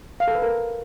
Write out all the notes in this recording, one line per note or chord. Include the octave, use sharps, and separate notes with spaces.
F5
A4
B4
A#4